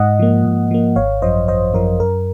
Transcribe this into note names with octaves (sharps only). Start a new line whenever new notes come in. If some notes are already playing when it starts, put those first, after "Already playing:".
Already playing: G#2 D#5 F#5
F3 A#3
G#2
F3 A#3
G#1 C#5 F5
F#2 F3 C5 D#5
G#1 C5 D#5
F#2 F3 A#4
F#2 A#4